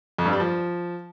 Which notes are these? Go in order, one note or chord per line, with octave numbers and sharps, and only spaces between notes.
F2
G2
G3
F3